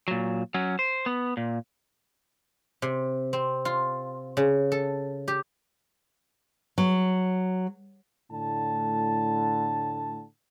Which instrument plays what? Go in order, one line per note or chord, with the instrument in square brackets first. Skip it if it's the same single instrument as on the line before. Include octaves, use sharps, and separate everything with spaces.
[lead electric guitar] A#2 F#3
F#3 C#4
C5
B3
A#2
[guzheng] C3
C4
F4
C#3
A4
G4
[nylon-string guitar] F#3
[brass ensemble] A2 D3 A5